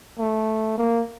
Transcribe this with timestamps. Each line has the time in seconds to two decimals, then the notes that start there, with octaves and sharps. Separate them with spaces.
0.19 A3
0.78 A#3